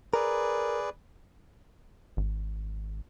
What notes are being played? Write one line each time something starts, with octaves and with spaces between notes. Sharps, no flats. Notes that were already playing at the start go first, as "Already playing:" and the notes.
G#4 A#4 B4 D5
G#1